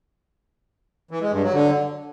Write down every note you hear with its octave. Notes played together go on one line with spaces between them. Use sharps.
E3
G#3
G2
F#3
D3